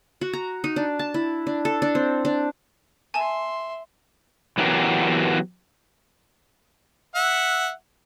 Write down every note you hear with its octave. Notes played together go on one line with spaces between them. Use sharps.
F#4
A#5
D#4
D4
A5
E4
D4
A4
D4
C4
D4
E5 G#5 A5 C6 E7
E3 F#3 B3 G4 A#4
E5 F#5